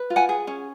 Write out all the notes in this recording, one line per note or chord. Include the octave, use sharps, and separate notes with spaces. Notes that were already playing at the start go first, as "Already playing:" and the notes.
Already playing: B4
F4
F#5 G#5
G#4
C#4